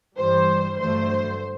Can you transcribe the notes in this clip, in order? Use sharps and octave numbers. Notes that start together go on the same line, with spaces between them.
G2 E3 G3 C5
G2 D3 F#3 A3 C5